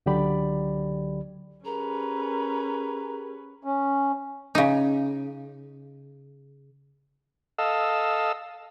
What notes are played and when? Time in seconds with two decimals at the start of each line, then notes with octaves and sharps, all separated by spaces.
0.06 C#2 D3 F#3 G4 D5 B5
1.65 C#4 G4 G#4 A#4 B4 A#5
3.64 C#4
4.55 C#3 D#4
7.58 A4 D#5 F5 E6